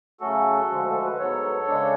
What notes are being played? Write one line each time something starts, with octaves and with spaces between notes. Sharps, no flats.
C#3 F#3 A3 C#4 F#4 A4
D2 D3 F3 G#3
A4
B4
G#2 F#3 B3 A4 C#5
C#3 G#3 D4